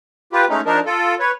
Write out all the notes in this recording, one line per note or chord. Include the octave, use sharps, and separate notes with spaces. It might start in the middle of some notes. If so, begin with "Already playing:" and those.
F4 G4 B4
G#3 A3 C#4 D#4
F3 D4 D#4 A#4
F4 A4
B4 C#5